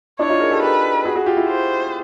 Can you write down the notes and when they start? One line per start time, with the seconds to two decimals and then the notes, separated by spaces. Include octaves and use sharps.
0.19 D4 E4 C#5
0.29 D#4 F4
0.40 G#4 A#4
0.51 G4 A4
0.62 G4 A4 B4
1.05 F#4 G#4
1.15 F#4 G#4
1.26 F4 G4
1.37 E4 F#4
1.48 C5